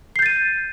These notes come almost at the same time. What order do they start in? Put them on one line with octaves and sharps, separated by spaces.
C7 G6 A6 D#7